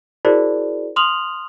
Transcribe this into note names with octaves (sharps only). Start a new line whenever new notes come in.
E4 F#4 G#4 A#4 C5 D5
C6 D#6 F6 F7 F#7